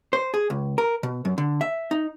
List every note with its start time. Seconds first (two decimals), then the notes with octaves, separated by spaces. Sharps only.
0.13 C5
0.34 G#4
0.50 C#2
0.78 A#4
1.03 B2
1.25 F#2
1.38 D3
1.61 E5
1.91 D#4